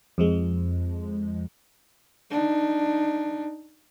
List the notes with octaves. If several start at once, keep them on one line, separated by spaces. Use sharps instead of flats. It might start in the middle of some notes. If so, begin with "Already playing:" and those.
F2 F3 G#3
D4 D#4